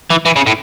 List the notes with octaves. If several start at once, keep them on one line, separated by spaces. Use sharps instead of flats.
E3
E3
C#3
A2